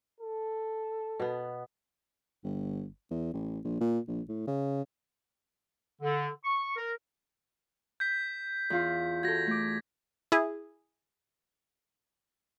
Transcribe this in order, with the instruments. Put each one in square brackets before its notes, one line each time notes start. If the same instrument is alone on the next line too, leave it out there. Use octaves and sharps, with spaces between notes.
[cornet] A4
[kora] B2 B3
[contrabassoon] G1
E2
A1
A#1
A#2
A#1
A2
C#3
[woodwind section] D3
C#6
A#4
[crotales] G6 B6
[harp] E2 F4 C6
[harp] F#4 A4 [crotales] G#6 A#6
[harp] A3 D6
[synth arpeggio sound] E4 G#4